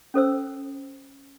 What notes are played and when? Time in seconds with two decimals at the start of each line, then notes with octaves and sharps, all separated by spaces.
0.14 C#4 A4 C5 E6